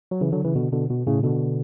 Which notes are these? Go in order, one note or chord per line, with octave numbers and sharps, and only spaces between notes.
F#3
C#3 E3
D3 F#3
C#3 E3
B2 D3
B2 D3
B2
A2 C#3
B2 D3